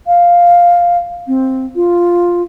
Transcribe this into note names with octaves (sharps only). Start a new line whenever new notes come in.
F5
C4
F4